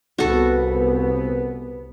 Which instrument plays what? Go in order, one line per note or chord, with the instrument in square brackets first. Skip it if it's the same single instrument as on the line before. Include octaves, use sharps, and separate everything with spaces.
[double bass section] C2 B3 [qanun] F#4 A4